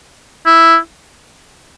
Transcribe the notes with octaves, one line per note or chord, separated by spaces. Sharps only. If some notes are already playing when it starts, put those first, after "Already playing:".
E4